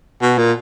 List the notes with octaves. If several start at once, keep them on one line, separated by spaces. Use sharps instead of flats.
B2
A#2